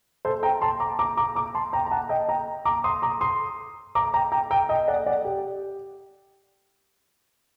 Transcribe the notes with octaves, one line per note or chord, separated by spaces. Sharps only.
A4 C5
G5 A#5
A5 C6
A#5 D6
A#5 D6
A#5 D6
A#5 D6
A5 C6
G5 A#5
A#5
F#5 A5
D#5 G5
G5 A#5
A#5 D6
C6 D#6
A#5 D6
C6 D#6
A#5 D6
G5 A#5
G5 A#5
G5 A#5
D#5 G5
D5 F#5
D5 F#5
G4